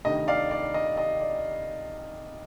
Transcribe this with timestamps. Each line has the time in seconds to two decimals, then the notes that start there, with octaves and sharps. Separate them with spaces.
0.05 D2 C3 D#3 A3 D#5
0.28 D5 F5
0.51 D5
0.74 D#5
0.97 D#5
1.21 D5